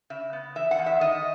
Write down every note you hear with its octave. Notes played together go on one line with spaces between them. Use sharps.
C#3 E5
B3
E3 E5
F#5
E2
E5
D#3 D#5